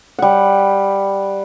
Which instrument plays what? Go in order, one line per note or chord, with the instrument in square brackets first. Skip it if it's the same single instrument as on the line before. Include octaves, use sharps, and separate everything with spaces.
[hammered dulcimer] G3 F#5